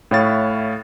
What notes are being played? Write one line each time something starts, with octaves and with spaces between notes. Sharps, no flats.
A2 E4 C#5 F5 A6